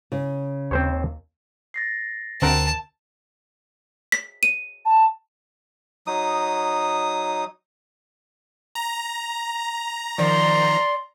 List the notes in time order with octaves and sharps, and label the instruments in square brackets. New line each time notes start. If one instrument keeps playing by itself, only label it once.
[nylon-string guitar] C#3
[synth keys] D#2 [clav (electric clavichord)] C4 C5 C#5
[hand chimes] A6 A#6 C7
[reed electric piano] D2 [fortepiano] C4 A#4 F#5 [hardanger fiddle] A5
[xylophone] B6
D#7
[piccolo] A5
[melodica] F#3 D#4 D#6
[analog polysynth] A#5
[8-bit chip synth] D#3 F3 [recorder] D5 [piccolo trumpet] C6